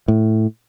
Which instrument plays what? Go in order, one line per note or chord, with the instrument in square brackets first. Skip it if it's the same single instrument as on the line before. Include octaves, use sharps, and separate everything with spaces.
[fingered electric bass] A2